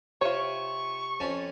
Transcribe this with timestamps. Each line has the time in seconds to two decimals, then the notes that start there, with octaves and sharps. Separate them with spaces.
0.21 C3 F4 C#5 C#6
1.20 F2 C#4 A5